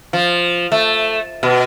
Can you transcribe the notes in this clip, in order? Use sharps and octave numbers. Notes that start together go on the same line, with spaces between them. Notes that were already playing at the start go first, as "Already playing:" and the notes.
F3
A3
B2